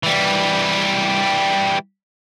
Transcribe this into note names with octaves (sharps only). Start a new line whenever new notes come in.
E3 G3